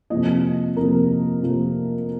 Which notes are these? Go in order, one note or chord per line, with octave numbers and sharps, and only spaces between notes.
F2 C3 F3 A#3 D#5
F2 C3 F3 A#3 A#4
F2 C3 F3 A#3